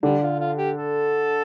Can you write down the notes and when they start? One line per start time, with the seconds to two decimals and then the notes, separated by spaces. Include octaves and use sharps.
0.03 D3 G3 D4
0.22 F4
0.39 F4
0.57 G4
0.76 A4